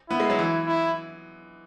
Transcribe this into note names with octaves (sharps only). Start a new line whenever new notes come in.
B3 E4
G#3
F#3
E3
E4